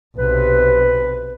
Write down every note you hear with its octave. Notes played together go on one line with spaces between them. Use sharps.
B1 C3 B4